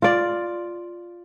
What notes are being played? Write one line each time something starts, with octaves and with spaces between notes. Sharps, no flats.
F4 D5